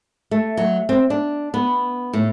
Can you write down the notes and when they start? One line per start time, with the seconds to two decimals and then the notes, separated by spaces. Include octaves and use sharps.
0.31 A3
0.57 F#3
0.89 C4
1.10 D4
1.54 B3
2.13 A2